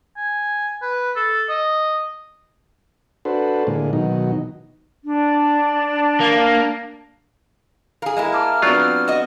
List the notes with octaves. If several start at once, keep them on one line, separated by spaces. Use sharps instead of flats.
G#5
B4
A4
D#5
D4 F#4 A4 B4 C5
A2 D3 G#3 A#3
B2 D#3 F#3 D#4
D4
A#3
G#4 A#4 F5
G#3 A#3 E4
A5 D6 F6
F#3 B3 C4 D4 F4
F#4 D#5